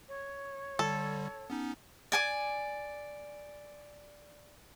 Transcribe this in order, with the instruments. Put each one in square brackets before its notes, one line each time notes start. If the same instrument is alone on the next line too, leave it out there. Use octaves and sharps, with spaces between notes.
[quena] C#5
[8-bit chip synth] D3 G3 [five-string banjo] A4
[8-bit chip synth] B3 C#4 D#4
[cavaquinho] D5 G#5 D6